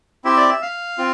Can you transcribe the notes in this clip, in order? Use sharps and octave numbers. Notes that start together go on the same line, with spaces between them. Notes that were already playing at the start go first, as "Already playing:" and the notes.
C4 E4 G4 E5
D5
E5
F5
C4 F4